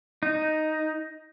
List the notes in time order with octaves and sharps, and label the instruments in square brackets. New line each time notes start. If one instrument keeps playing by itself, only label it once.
[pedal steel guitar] D#4